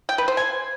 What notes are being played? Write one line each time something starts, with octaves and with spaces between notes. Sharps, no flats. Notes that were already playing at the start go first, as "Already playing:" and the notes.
G5
B4
C5
G#5